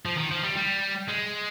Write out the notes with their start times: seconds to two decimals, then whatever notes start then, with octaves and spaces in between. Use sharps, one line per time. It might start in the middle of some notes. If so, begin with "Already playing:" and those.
0.05 F3
0.18 D#3
0.31 F3
0.44 G3
0.57 G3
1.09 G#3